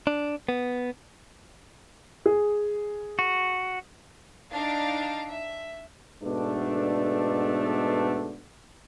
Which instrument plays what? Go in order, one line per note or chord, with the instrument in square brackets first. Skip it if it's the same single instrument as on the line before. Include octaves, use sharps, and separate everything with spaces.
[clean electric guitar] D4
B3
[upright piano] G#4
[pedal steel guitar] F#4
[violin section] D4 D#4 F5 A6 D7
E5
[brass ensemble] G#2 B2 D3 A3 B3 D4